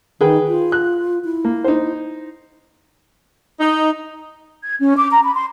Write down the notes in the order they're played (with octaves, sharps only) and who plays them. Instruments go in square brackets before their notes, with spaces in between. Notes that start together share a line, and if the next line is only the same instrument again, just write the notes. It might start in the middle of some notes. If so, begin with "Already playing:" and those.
[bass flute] D#3 [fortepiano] G#4 B4 G5
[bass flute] F4
[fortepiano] F#6
[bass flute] E4
[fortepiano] A#3
D#4 C5
[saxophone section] D#4
[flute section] G#6
C#4
D6
A#5
B5
C6